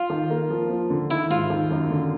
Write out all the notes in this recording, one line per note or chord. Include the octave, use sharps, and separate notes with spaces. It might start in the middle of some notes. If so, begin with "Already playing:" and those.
Already playing: F4
D#3
A#3
F3
F3
D3
D#3 E4
G#2 F4
D#3
F#2
D3